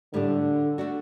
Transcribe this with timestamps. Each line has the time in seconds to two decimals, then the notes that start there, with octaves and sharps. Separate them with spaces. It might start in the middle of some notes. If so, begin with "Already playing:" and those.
0.13 A2 D3 G3 D4
0.78 D3 A3 D4 F#4